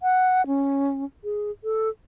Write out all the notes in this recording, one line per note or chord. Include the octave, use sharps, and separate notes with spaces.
F#5
C#4
G#4
A4